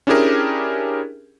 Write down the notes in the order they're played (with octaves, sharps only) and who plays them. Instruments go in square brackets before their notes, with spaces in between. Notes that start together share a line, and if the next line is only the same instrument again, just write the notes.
[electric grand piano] C#4 D4 E4 G4 G#4 A#4